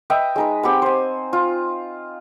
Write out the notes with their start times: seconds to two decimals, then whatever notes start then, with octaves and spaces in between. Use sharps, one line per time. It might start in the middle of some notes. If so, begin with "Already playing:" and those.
0.10 B4 D#5 E5 G5
0.36 G#3 D#4 B4
0.63 C4 G4 F#5 B5
0.82 C5 G#5
1.33 F4